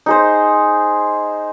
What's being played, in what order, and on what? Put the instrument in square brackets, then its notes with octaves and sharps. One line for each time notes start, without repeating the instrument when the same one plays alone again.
[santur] D#4 G#4 C5